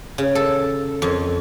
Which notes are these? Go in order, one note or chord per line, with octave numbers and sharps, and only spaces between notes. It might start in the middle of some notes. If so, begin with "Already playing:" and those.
C#3
A4
F2